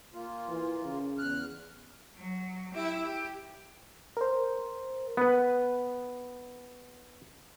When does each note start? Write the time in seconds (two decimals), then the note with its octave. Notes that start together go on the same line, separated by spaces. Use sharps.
0.14 A#2 A#3 F4
0.49 E3
0.84 C#3
1.18 E2 F6 F#6
2.17 F#3
2.72 E4 G4
3.03 G4
4.17 A#4 C5
5.17 B3 B4